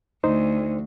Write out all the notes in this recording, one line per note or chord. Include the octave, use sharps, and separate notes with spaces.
D2 D#4 C5